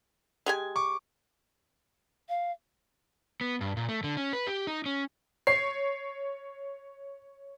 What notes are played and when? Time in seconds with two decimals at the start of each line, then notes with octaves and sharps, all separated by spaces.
0.46 G#3 G4 G#5
0.76 C#6 D6
2.29 F5
3.41 B3
3.61 G2
3.77 A#2
3.89 A3
4.04 D3
4.17 C#4
4.33 B4
4.47 G4
4.67 D#4
4.86 C#4
5.47 C#5 C7